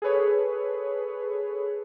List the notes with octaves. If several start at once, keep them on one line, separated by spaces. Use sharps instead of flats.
G#4 A4 B4 C#5